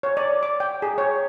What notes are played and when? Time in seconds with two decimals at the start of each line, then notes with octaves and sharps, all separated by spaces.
0.03 C#5
0.17 D5
0.43 D6
0.60 G5
0.82 G#4
0.98 C#5